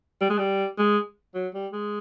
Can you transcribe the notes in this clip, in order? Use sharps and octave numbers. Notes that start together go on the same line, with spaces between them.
G3
G#3
G3
G#3
F#3
G3
G#3